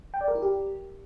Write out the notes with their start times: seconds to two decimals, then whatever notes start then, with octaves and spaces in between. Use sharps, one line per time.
0.14 G5
0.21 D5
0.28 A#4
0.35 E4
0.42 G4